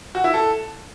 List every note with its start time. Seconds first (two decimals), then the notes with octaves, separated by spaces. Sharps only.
0.15 F#4
0.24 E4
0.34 A4